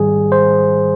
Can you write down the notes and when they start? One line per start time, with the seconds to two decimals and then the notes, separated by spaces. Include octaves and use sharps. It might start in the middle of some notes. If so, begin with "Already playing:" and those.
Already playing: G#2 D#3 G3 G#4
0.32 C5